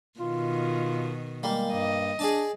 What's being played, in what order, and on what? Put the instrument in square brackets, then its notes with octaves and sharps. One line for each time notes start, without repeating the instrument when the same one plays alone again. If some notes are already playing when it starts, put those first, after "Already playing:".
[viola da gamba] B2 D#3 [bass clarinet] F4
[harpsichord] G3 A#3 [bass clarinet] G#3
[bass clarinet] G2 [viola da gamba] D#5
[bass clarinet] D4 [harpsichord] G#4 D5 A5